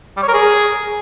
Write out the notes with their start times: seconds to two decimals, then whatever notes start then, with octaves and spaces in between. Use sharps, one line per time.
0.17 G3
0.22 C#5
0.28 A#4
0.34 G#4